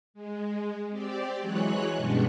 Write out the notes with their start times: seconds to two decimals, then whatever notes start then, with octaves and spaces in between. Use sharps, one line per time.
0.14 G#3
0.90 C4 G4 D5
1.41 E3 F#3 G#3 C#5 F#6
1.96 G2 B2 G#3 C#4 D4 G4